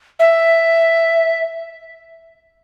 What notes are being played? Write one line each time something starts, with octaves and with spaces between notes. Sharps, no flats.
E5